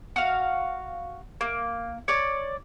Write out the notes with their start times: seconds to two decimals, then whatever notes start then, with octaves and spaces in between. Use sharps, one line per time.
0.16 F#4 F5
1.41 A#3
2.08 C#5 D5